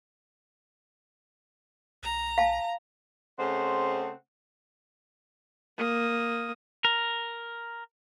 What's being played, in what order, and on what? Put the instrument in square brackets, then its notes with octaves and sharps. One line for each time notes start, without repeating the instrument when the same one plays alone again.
[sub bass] B1 [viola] A#5
[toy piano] F5 A5
[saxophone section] C#3 A3 C4 C5 D#5 F#5
[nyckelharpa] A#3 D#6
[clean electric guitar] A#4